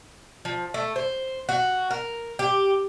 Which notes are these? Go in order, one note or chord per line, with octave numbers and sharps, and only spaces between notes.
F3
A3
C5
F#4
A#4
G4